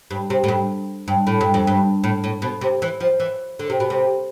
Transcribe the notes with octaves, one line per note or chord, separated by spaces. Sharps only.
G2
C3
A2
G2
G2
A2
G2
F2
G2
A2
A2
B2
C3
E3
F3
E3
D3
C3
B2
C3